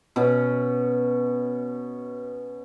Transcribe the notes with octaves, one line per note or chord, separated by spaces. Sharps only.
B2 C#4